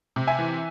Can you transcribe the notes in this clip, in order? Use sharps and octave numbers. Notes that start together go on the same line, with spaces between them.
C3
E5 G#5
E3